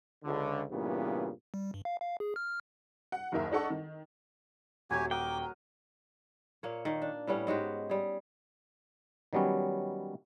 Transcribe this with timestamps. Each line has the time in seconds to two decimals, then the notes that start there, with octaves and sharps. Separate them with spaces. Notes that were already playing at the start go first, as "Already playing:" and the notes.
0.24 C#2 D3
0.71 G2 A#2 C#3 E3 B3
1.54 G3
1.74 G2
1.85 F5
2.01 F5
2.20 G#4
2.36 F6
3.12 F#5
3.32 F#1 D#2 D#4 A#4 E5
3.52 D4 D#4 A4 F#5 C#6
3.70 D#3
4.91 D#1 F#3 G4 C#5 E5 G#5 G#6
5.11 A#4 F#5 G5 D6 D#6
6.63 A#2 A#3 C#5
6.85 D#3 A#3
7.02 D4
7.27 A2 G3 B3 C#4
7.47 G#2 G#3 F#4 G4
7.90 G3 G#4
9.33 D#3 F#3 G3 B3 C#4